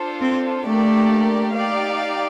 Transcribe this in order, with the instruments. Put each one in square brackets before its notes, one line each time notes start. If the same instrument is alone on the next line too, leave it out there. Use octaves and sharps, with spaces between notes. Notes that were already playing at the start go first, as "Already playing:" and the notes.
Already playing: [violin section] D4 F4 A4 C5
[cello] C4
[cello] A3 [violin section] A#3 D4 G4 A#4 D5
[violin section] D#4 G4 D5 F5